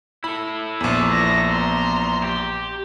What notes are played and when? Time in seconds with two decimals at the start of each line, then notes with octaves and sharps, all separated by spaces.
0.24 E4 A4 B5
0.81 A#1 E2
1.11 A#6
1.49 A#5 C6
2.23 G4